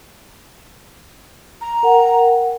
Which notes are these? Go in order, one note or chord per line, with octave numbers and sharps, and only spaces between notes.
A#5
A#4 F#5 G5